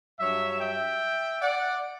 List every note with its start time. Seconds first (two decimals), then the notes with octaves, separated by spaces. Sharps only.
0.20 G2 F#3 C#5 E5
0.61 E5 G5
1.42 D5 F#5